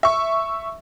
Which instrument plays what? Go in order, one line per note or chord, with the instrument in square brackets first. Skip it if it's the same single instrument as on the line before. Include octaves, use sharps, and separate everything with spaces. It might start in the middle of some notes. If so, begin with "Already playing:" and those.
[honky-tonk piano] E5 C#6